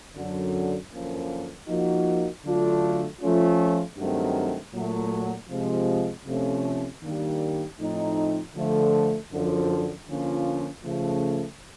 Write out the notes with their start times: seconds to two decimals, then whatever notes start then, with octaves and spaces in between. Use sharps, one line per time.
0.15 F#2 D3 F#3
0.91 F#2 D3 F3 A#3 C#4
1.67 F3 A#3 D#4 F#4
2.44 D3 F#3 A3 D4 F4
3.20 F3 A3 C#4 F4
3.97 G2 D#3 F#3 A3 C4
4.73 A#2 F#3 A3
5.49 C3 F3 G#3
6.25 C3 F3 A3 C#4
7.02 D#3 G3 A#3 D4 G4
7.78 A2 F3 A3 C4 D#4
8.55 D3 F3 A3
9.31 F#2 D3 F3
10.07 D3 F3 A#3 C#4 F4
10.84 C#3 F3 A3